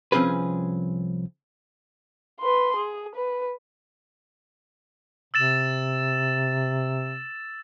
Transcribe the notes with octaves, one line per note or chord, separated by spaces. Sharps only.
C2 F3 C4 C#4 G#4 B4
B4 C6
G#4
B4
C3 E6 A6 E7